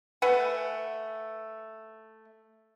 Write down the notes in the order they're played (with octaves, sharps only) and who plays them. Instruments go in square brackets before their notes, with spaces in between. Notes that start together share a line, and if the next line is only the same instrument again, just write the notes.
[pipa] A3 B4 F#5 G#5